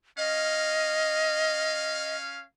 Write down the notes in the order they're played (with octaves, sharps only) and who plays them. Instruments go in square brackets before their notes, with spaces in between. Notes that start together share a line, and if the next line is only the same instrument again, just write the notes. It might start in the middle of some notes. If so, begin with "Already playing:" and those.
[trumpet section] C#4 F5 [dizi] D#5